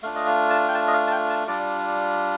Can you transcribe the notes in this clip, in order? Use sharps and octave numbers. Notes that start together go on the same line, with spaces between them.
A3 D4 F4 F5
D#5
F5
A5
G5
A5
D#5
F5
A5
G5
A5
G3 D4 F4 D5